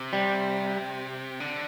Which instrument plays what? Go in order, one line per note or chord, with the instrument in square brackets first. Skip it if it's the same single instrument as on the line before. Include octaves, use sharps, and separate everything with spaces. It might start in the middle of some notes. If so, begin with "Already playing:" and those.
Already playing: [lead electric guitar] C3
[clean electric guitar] G3
[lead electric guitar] D3